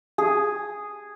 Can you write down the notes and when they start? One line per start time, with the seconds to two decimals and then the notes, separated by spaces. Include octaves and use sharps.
0.18 G#4